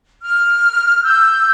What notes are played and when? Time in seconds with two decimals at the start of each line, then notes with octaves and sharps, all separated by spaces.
0.22 F6
1.03 E6 G6